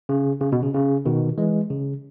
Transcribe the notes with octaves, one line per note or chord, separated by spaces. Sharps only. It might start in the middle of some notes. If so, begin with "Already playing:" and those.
C#3
C#3
B2
C#3
C#3
B2 D#3
E3 G#3
C#3